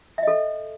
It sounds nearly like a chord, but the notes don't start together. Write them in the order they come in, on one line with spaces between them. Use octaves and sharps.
E5 D#5 A4